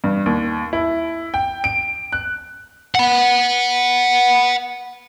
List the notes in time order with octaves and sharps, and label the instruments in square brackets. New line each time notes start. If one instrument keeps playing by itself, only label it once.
[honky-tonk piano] G2
D#2
E4
G5
D7
F#6
[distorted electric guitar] F#5 B5